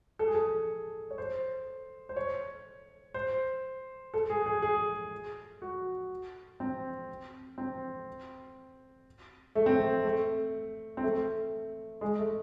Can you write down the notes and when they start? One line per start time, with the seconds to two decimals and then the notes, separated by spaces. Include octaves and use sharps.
0.19 A4
0.27 G#4
0.35 A4
1.11 C#5
1.18 C5
2.09 C5
2.16 C#5
3.14 C5
4.14 A4
4.30 G#4
4.46 G#4
4.62 G#4
5.62 F#4
6.60 C4
7.58 C4
9.55 A3
9.66 C4
9.77 A3
10.05 A3
10.97 C4
11.03 A3
12.01 G#3
12.19 A3